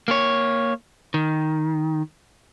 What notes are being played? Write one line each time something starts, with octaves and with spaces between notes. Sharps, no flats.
A#3 C#5
D#3